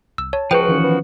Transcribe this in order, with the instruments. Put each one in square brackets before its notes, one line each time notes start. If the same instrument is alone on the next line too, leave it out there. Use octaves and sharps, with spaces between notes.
[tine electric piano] C2 [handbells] E6
[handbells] C#5 [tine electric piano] A5
[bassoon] C#2 [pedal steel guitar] F3 F#4 [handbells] B4 C5 G5
[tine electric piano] D#3 E3 C#4
[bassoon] B3